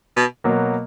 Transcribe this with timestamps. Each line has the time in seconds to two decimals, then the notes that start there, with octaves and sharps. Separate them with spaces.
0.17 B2
0.44 B2 F#3 A#3